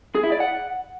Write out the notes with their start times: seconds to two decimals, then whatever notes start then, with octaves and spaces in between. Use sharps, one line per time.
0.15 G#4
0.23 E4
0.32 D5
0.40 F#5